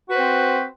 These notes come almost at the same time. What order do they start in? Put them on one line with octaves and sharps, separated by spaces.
F#4 B4 C5 C4